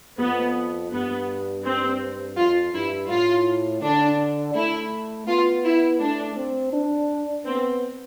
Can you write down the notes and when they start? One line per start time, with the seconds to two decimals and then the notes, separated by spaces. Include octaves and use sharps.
0.19 F2 B3
0.92 G2 B3
1.64 C4
2.37 F2 F4
2.74 G2 E4
3.09 A2 F4
3.82 D3 D4
4.55 A3 E4
5.27 B3 F4
5.64 E4
6.00 A3 D4
6.36 C4
6.73 D4
7.45 B3 C4